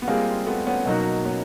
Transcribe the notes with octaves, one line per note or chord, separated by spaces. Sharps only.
B3
G3 G#3 A#3 C4 F4 G#4
A3 B3
B3 C#4
B2 F#3 A#3 D#4 F#4
B3 C#4